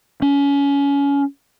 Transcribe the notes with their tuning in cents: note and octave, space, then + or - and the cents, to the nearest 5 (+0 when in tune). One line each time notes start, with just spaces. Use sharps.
C#4 +25